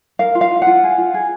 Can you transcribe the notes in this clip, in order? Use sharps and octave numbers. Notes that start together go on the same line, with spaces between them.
A#4 F5
F4
F5
F4
F#5
F4
G#4
F4
G#4